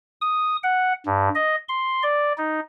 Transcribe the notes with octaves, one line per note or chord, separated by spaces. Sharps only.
D#6
F#5
G2
D#5
C6
D5
D#4